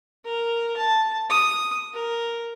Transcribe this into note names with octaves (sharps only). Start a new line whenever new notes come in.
A#4
A5
D#6
A#4